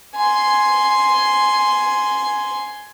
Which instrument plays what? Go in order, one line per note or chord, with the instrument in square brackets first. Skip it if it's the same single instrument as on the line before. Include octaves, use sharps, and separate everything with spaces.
[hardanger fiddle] G#5 C6